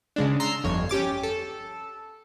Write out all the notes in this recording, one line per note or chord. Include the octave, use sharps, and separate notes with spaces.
C#3 G#3 D4
A#5 C6 E6 C7
G1 F2 C#5
C#4 G4 D6 A6
A4